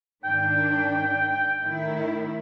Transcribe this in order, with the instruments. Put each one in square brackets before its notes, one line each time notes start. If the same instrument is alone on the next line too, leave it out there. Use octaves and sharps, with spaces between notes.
[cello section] G#2 D#3 D4 [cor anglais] G5
[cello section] A2 D#3 E4